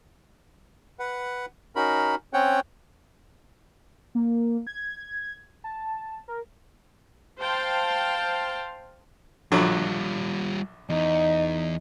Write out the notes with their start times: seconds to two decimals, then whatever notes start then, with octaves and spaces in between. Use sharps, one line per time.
0.99 B4 F#5
1.76 C#4 D#4 F#4 A#4 B5
2.33 C4 C#4 C#5 F#5 G5
4.15 A#3
4.67 G#6
5.64 A5
6.28 A#4
7.39 C5 F5 G5 A5
9.52 A#1 D3 F#3 G3 F4
10.90 E2 D#4